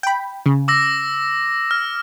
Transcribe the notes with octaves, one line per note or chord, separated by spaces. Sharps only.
G5 B5
C#3
D6 E6 A#6
F6